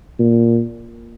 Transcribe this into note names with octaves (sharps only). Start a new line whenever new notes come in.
A#2